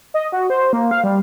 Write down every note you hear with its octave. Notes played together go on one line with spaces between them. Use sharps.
D#5
F#4
C5
A#3
F5
G3